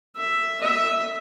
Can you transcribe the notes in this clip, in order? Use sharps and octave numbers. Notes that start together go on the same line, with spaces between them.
E5
E5